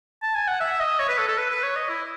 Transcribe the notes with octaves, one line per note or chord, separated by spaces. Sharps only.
A5
G#5
F#5
E5
D#5
C#5
B4
A4
A4
B4
B4
C#5
D#5
E4